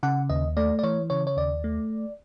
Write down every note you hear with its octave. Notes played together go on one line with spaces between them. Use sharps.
C#3 F#5
D#2 D#5
A3 D5
D5
E3 C#5
C#3 C#5
C#5
D#2 D5
A3